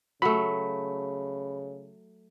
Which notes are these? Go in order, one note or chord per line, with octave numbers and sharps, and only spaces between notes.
C#3 F#3 A3 B5